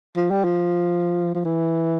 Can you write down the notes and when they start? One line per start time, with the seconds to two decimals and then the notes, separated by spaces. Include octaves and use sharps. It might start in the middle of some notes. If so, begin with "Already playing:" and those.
0.16 F3
0.30 G3
0.44 F3
1.35 F3
1.45 E3